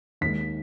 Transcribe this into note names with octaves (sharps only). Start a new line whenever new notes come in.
D#2 D#3 G#3 B6